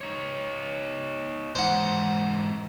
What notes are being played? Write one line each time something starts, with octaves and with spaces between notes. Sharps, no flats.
D#4 C#5
G#2 E3 C5 F#5